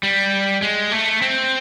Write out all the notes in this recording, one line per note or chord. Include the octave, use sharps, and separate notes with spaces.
G3
G#3
A3
C4